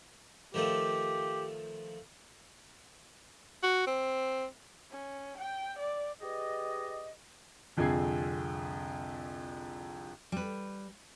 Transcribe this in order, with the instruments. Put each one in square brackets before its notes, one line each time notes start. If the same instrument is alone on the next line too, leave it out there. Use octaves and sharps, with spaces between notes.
[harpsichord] D#3 F3 A3 [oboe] G4
[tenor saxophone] F#4
C4
[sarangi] C#4
G5
D5
[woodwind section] G4 G#4 B4 D5 D#5
[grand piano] C2 F2 D3 G#4 G#6 C7
[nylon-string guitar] G3 B4